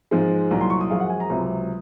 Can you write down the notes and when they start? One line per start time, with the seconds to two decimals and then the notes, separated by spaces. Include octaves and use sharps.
0.11 G#2 F3 G#3
0.51 C2 A#2 F#3 A#5
0.61 C6
0.70 C#6
0.81 D#6
0.90 F#2 F3 G#3 F5
1.00 F#5
1.10 G#5
1.20 A#5
1.30 C#2 C3 F#3